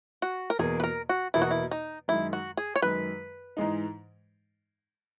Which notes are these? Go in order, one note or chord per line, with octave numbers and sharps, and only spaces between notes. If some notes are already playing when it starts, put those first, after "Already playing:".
F#4
A#4
E2 B2 A#3 G#4
B4
A#4
F#4
E2 B2 A#3 E4
F#4
E4
D#4
F#2 D#3 G#3 E4
F#4
G#4
C#5
F#2 D#3 G#3 B4
G#2 E3 G#3 D#4